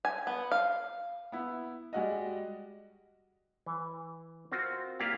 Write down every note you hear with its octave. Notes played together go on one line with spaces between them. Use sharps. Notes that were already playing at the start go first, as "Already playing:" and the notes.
G#5
B3
F5
B3 E4
G3 G#3 F#4 D#5
E3
C4 F4 F#4 A#4
A#3 E4 F4 G4 D5 F5